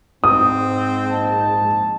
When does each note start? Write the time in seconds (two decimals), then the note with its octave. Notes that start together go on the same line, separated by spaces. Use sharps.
0.24 G#2 C4 D#6
1.07 A#1 D#5 A5